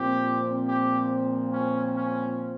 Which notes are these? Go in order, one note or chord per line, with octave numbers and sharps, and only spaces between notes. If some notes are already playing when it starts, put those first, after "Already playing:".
Already playing: A#2 F3 C4 G4
G4
C#4
C#4